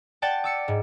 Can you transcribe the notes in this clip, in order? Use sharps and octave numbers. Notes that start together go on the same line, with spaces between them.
D5 F#5 G5 A5 A6
D6 E6 C#7
G#2